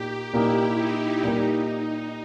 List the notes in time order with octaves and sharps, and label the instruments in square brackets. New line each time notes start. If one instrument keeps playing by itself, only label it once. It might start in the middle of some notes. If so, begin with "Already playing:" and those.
Already playing: [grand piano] A#2 A#3 D#4 [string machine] G4
[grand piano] A#2 A#3 D#4 G4 [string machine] E4
[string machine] D#4
[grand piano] A#2 G3 A#3 [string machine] D#4